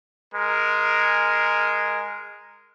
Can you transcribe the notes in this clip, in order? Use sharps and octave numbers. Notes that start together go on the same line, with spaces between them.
G#3 A#4